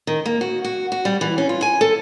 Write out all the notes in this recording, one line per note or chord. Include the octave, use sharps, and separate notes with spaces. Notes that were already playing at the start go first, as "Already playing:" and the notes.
D#3
A#3
F#4
F#4
F#4
G3
E3
C#4
F4
G#5
A4